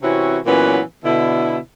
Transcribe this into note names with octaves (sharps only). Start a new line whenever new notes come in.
C3 E3 C4 C#4 E4 F#4
A#2 E3 F#3 B3 C#4 E4
B2 D3 E4